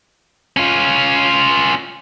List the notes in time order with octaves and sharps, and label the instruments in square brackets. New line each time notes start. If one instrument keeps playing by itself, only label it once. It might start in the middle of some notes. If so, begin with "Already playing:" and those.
[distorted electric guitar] C#4 F4